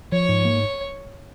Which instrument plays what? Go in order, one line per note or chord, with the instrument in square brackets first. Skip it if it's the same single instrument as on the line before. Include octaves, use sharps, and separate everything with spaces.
[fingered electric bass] F3 [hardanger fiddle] C#5
[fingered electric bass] G#2
A#3